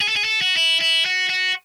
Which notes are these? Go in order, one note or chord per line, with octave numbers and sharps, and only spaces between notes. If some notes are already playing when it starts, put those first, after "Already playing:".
G#4
A4
G#4
A4
F#4
E4
E4
F#4
F#4